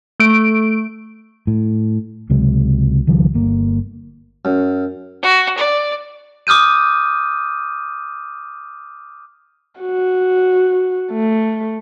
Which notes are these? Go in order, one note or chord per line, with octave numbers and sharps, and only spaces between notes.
A3 D7
A2
C#2 C3 F#3 G#3
C#2 D#3 F3 G3
G1 A#3
F#2
F#4
D5
D6 D#6 F6 G6 D#7
F#4
A3